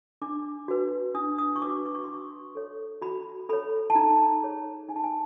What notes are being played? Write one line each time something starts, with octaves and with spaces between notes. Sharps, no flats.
D4 D6
F#4 B4
D4 D#6
D#6
C#6
F#4 B4 D6
D6
C#6
F#4 C6
C#6
A4 C#5
F#4 B5
A4 C#5 B5
A5
D#4 A#5
G#4 C#5
D#4 G#5
A5
G#5